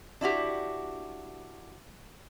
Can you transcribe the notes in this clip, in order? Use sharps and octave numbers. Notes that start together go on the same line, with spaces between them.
D4 E4 F#4 G4